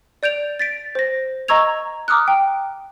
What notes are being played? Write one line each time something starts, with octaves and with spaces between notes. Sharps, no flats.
D5 G6 D7 F7
A6 B6 D7
C5 A#6
D#5 A#5 C#6 E6 G#6 F7
A#5 D6 D#6 F6 F#6
G5